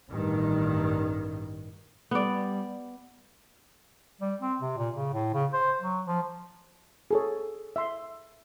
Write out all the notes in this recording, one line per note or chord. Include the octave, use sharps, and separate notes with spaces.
A1 G2 D#3
G3 B3 D5
G3
C4
C3
A#2
C#3
A2
C#3
C5
F#3
F3
G#4 A4 C#5
E5 C6